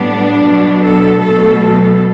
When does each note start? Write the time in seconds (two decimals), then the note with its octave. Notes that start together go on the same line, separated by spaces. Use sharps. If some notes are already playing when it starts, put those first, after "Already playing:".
Already playing: A2 G3 B3 D4
0.42 B2 F#3 B3
0.81 A4
1.20 B2 F#3 A3 A4
1.59 A4